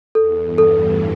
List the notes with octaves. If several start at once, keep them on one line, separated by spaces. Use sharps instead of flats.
E2 A4
G2
A4
A2